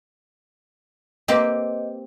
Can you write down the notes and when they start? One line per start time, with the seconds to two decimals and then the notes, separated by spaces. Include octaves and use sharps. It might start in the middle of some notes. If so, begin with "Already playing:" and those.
1.28 A#3 C4 G4 B4 D#5